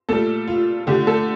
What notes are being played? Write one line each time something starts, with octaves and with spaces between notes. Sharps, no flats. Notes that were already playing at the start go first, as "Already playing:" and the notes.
A#2 G3 A3 A4
F4
D3 F3 A3 G4
A3 A4